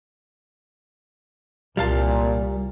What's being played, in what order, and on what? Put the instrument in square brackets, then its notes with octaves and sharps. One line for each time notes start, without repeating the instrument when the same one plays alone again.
[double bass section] C2 [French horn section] A#2 [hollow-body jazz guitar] G3 F5 A5